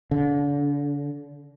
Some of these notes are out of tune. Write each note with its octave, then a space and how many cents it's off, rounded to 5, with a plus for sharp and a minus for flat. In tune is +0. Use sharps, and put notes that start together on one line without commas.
D3 -35